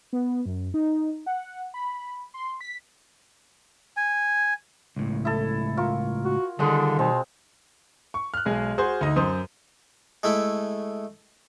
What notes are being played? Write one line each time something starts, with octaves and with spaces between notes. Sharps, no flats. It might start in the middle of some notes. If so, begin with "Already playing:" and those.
B3
F#2
D#4
F#5
B5
C6
B6
G#5
C#2 A2
E4 A4
F4 A#4 C#6
F#4
D3 D#3 G3 G#3 D#5
B2 C4
C#6
F6 F#6
B1 G#3 G#4
F#4 G#4 C5
D2 D#4 D#5
F#2 C5 D#6
G#3 A3 E4